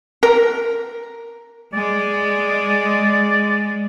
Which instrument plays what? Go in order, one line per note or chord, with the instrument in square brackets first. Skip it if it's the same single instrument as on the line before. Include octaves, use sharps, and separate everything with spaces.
[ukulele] A#4
[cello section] G#3 [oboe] D5